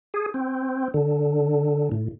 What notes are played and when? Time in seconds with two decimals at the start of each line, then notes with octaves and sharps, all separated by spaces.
0.14 G#4
0.34 C4
0.94 D3
1.92 A2